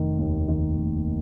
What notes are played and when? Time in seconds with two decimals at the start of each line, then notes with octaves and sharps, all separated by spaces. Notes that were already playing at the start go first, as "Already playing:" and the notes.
Already playing: F1 D#3
0.18 D#2
0.48 D#3
0.78 F1